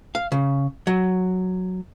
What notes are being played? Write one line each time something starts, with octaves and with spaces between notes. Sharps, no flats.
F5
C#3
F#3